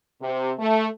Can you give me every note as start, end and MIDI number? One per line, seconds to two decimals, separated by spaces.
0.22 0.53 48
0.59 0.88 57